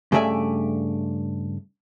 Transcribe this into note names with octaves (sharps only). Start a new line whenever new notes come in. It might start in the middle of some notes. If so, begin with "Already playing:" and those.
G2 C#3 A3 D5 E5 G#5